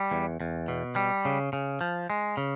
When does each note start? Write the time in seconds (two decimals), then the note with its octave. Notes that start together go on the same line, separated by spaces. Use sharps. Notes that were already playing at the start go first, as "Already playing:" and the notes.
Already playing: G3
0.11 E2
0.41 E2
0.68 B2
0.96 G3
1.25 C#3
1.53 C#3
1.81 F3
2.10 G#3
2.37 C#3